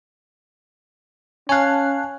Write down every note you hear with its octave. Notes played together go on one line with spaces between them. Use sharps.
C#4 C#5 F5 G#5 A5 F#6